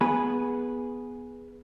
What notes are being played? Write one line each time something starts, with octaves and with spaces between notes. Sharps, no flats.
B3 G#4 B4